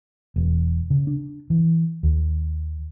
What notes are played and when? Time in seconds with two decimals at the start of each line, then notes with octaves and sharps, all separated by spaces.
0.36 E1
0.90 C#3
1.07 D4
1.50 E3
2.03 D#2